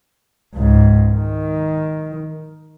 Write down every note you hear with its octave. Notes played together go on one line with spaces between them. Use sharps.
C#2 G#2
D#3